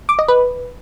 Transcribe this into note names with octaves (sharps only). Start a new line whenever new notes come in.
D6
D#5
B4